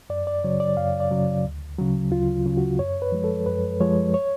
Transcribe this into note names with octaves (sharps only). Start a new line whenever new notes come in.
F#2 D5
D5
C#3 F#3 C#5
D5
F#2 F5
D5
C#3 F#3
D2
C#3 F#3
D2 F4
C#3 F#3
F#4
F#2 C#5
B4
F3 G#3
A4
F#2 B4
F3 G#3 C#5
C#5